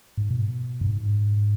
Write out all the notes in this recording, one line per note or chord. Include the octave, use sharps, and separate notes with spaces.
G#2
B2
G2
G#2